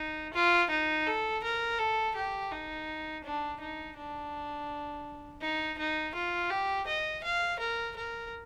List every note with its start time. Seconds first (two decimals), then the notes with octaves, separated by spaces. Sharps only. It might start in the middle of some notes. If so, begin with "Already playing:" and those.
Already playing: D#4
0.34 F4
0.70 D#4
1.06 A4
1.44 A#4
1.79 A4
2.16 G4
2.52 D#4
3.24 D4
3.61 D#4
3.97 D4
5.41 D#4
5.78 D#4
6.15 F4
6.50 G4
6.87 D#5
7.24 F5
7.60 A#4
7.96 A#4